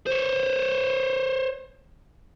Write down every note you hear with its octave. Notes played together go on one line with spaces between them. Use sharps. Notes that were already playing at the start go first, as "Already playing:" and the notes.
C5 C#5